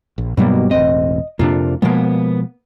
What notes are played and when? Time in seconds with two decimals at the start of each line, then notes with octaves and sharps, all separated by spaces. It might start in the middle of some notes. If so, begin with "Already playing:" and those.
0.18 A#1
0.37 G2 B2 F#3 G3 A#3 B3
0.71 E1 A1 C4 D#5
1.39 F2 C3 A#3 D4 F4
1.82 B2 F3 G#3 A#3 B3